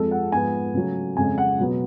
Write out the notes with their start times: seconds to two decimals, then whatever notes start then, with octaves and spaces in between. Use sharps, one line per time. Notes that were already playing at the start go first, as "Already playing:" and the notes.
Already playing: F2 F3 G#3 A4
0.11 F#5
0.32 G#2 F3 B3 G#5
0.74 C#3 F#3 A3
1.17 F2 C#3 G#3 G#5
1.38 F#5
1.59 B2 F#3 B3